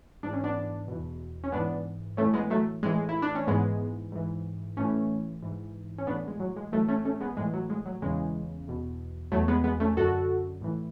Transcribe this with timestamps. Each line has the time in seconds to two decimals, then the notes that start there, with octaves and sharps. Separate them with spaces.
0.23 G#2 E3 D4
0.33 C#4
0.44 B3 D4
0.88 E2 B2
1.44 C#4
1.52 G#2 E3 B3 D4
2.17 E3 A3 C#4
2.23 A2
2.33 G#3 B3
2.50 F#3 A3
2.83 A2 E3 G#3
3.09 E4
3.22 D4
3.35 C#4
3.47 G#2 E3 G#3 B3
4.12 G#2 E3
4.77 A2 E3 A3 C#4
5.43 G#2 E3
5.98 C#4
6.07 A2 B3 D4
6.11 E3
6.28 G#3
6.40 F#3
6.56 G#3
6.72 A2 E3 F#3 A3
6.88 A3 C#4
7.05 A3 C#4
7.20 G#3 B3
7.37 A2 E3 G#3
7.53 F#3
7.70 G#3
7.86 F#3
8.02 E2 C#3 E3 G#3
8.68 E2 B2
9.32 E2 B2 F#3 A3
9.48 G#3 B3
9.64 G#3 B3
9.80 A3 C#4
9.97 F#2 D3 F#4 A4
10.61 A2 E3